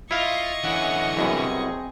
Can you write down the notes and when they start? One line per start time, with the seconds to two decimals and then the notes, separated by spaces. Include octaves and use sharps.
0.11 E4 F4 D#5 F5 C#6
0.63 D3 E3 C#4 E5 F#5
1.17 C2 F#2 B2 C4 G#4